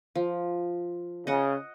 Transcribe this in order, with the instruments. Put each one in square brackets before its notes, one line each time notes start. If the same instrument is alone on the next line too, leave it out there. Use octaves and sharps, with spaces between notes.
[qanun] F3
[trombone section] C#3 [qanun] D#5 F#5